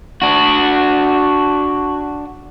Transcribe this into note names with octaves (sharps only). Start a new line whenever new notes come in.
D4 F#4